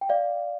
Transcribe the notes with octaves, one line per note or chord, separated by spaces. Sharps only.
G5
D5 F5